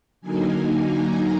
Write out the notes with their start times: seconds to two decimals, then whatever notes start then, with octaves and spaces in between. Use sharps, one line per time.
0.21 D3 F#3 A#3 D#4 G#5
0.85 A#5